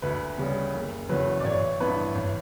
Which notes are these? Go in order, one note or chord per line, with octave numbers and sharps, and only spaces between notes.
D2 B4
C#3 G3 B3
F#1
E2 C#3 F#3 B4
D5
A1 C#5
G2 E3 B3 B4
A1